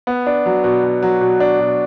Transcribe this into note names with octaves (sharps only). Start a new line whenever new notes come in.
B3
D4
F#3
B2
B2
F#3
B2
D4
B2